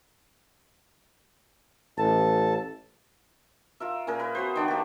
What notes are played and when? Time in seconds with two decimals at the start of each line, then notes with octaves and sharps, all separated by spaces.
1.98 A1 A4 A5
3.80 F4 A#4 E5
4.07 A#2 C#4 G#4 A#4
4.20 B4
4.35 B3 F#4 C5
4.56 D#3 D4 C#5
4.68 A#3 G4